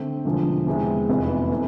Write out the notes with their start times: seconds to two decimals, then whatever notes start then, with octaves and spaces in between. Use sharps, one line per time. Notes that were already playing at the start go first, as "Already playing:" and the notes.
Already playing: D3 A3 C4
0.25 E1 E2 D3 F3
0.67 E2 C3 G#3 C4 E4
1.09 F1 F2 E3 B3
1.50 C3 E3 A3